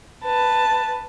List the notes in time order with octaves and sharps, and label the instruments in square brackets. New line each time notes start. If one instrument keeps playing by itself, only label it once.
[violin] B4 A5